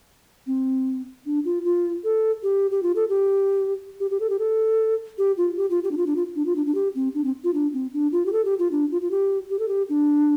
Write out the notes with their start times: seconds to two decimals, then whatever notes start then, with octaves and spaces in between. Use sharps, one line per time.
0.47 C4
1.26 D4
1.45 F4
1.65 F4
2.04 A4
2.43 G4
2.71 G4
2.83 F4
2.96 A4
3.09 G4
4.00 G4
4.11 G4
4.20 A4
4.30 G4
4.39 A4
5.18 G4
5.37 F4
5.57 G4
5.70 F4
5.84 G4
5.91 D4
5.97 F4
6.07 D4
6.16 F4
6.36 D4
6.46 F4
6.56 D4
6.66 D4
6.75 G4
6.95 C4
7.14 D4
7.24 C4
7.44 F4
7.54 D4
7.73 C4
7.94 D4
8.12 F4
8.26 G4
8.33 A4
8.45 G4
8.59 F4
8.72 D4
8.91 F4
9.02 F4
9.11 G4
9.50 G4
9.59 A4
9.68 G4
9.89 D4